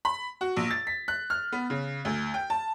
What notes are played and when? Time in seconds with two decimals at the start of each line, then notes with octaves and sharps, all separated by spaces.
0.05 B5
0.41 F#4
0.56 A#1
0.70 A6
0.87 B6
1.08 F#6
1.30 F6
1.52 B3
1.70 C#3
2.05 D2
2.34 G5
2.50 A5